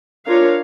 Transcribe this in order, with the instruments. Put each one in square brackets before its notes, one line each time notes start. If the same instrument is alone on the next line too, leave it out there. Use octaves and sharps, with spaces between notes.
[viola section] D4 F4 A#4 C#5 F5